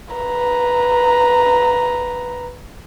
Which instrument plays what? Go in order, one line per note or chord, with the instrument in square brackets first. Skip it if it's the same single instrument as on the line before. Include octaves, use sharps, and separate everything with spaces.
[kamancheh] B4 A#5